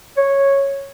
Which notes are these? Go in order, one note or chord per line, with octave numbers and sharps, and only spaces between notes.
C#5